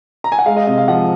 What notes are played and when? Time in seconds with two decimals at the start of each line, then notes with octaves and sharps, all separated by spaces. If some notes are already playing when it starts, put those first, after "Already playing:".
0.24 A#5
0.32 G#5
0.39 F#5
0.46 G#3 F5
0.56 D#5
0.67 C3 D#5
0.78 F5
0.88 F3 F#5